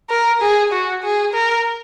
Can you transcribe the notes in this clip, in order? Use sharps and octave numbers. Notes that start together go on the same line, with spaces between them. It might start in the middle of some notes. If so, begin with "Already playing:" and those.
A#4
G#4
F#4
G#4
A#4